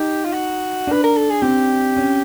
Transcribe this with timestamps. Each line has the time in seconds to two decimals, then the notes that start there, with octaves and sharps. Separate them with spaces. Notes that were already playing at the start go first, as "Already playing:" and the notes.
Already playing: D#4 G4
0.25 F4
0.33 F#4
0.87 D4 B4
1.04 A#4
1.17 A4
1.30 G#4
1.42 C4 G4
1.97 C#4